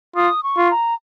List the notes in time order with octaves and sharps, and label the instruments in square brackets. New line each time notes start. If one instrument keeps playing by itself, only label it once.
[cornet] F4 [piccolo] D#6
[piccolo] C#6
[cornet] F4
[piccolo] A#5